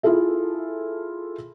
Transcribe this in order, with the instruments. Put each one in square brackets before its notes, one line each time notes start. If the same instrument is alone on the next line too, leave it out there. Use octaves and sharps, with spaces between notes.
[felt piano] E4 F4 G#4 A4 E5